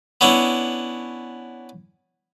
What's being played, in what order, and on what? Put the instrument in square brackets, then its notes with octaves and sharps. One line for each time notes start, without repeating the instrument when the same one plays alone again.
[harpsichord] B3 C#4 D4 E4